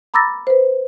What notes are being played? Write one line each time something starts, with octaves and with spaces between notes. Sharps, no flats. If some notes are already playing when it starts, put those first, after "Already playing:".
A#5 B5 D6 E6 A6 A#6
B4 C5